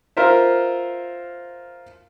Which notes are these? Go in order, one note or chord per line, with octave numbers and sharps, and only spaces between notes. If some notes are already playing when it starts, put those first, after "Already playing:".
F4 A#4 C5 E5